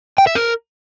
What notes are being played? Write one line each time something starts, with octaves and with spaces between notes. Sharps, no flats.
G5
E5
A#4